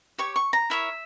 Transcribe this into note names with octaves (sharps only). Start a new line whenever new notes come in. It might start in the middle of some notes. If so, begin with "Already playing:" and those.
G4 C#5 C#6
C#6
A#5
E4 A#4 C#5 E5